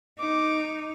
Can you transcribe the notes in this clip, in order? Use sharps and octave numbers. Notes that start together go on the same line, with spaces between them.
D#4 D6